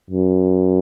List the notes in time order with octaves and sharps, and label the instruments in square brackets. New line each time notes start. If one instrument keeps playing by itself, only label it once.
[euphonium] F#2